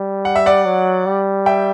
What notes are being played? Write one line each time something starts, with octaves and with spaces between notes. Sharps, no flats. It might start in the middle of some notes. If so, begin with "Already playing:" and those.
Already playing: G3
F#5
E5
D5 F#5
F#3
G3
E5 G5